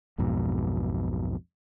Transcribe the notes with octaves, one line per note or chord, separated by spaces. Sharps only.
B1 F2 G#2 B2